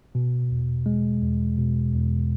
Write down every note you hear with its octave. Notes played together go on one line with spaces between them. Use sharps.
B2
E2
G#3
E2
B2
E2